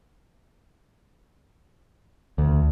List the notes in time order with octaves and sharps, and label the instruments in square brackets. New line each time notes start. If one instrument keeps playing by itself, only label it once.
[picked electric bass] D2